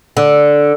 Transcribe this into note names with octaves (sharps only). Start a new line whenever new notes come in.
D3